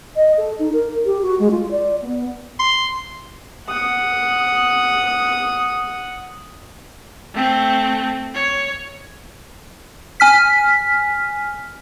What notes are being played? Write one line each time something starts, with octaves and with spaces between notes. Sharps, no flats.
D#5
A4
D#4
A#4
G4
F#4
G#3
F4
D5
B3
C6
F#5 D#6
A3 C4
C#5
G#5 F6 B6